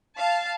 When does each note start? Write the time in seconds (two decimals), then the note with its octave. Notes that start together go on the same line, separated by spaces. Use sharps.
0.16 F5 A5